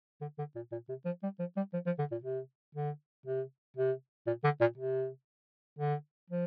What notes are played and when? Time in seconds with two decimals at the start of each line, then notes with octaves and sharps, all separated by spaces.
0.21 D3
0.38 D3
0.55 A#2
0.72 A#2
0.89 C3
1.05 F3
1.23 G3
1.39 F3
1.57 G3
1.73 F3
1.86 F3
1.99 D3
2.11 A#2
2.24 C3
2.75 D3
3.26 C3
3.76 C3
4.27 A#2
4.44 D3
4.61 A#2
4.77 C3
5.79 D3
6.30 F3